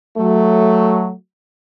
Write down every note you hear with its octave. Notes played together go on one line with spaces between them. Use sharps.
F#3 A3